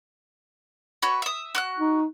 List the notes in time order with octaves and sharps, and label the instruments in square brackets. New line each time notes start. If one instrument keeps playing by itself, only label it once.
[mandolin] F#4 B4 C#5
E5 D#6
F#4 D6 F#6
[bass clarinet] D#4